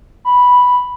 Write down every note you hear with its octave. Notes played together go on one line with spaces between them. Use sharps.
B5